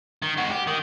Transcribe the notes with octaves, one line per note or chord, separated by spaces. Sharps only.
D#3
G#3 F#4
G4
D#3